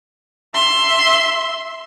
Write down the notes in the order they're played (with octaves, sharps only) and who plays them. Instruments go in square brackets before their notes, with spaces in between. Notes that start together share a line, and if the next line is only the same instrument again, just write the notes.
[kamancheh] E5 C6